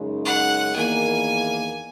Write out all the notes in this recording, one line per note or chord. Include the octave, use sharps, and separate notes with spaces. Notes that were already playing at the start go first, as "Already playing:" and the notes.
Already playing: F#2 C#3 G#3 D#4
F#5
E2 D#3 A#3 G#5